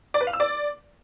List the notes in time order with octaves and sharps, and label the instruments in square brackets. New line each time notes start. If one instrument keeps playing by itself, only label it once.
[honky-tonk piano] D5
B4
F5
E6
D5